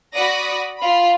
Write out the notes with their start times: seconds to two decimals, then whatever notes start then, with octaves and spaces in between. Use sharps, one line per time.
0.12 F#4 D5 F#5 B5 D#6 A#6
0.78 F4 B5